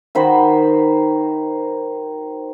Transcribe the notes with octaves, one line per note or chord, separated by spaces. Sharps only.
D#3 F#4 C5 B5